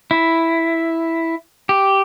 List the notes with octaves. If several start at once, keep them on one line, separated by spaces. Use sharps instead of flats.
E4
G4